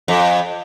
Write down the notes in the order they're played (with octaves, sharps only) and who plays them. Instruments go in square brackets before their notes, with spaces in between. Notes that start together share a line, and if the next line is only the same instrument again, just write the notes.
[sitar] F2